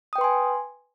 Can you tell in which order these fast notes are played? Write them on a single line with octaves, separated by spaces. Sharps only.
D#6 G5 B4 C6 G#5